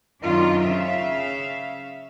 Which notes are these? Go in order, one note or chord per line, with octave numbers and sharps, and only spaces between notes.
F#2 D#3 C4 D4 F4
C#3 E5 F5